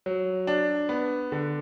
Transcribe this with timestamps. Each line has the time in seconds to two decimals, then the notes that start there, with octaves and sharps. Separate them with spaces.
0.06 F#3
0.47 D4
0.89 B3
1.32 D3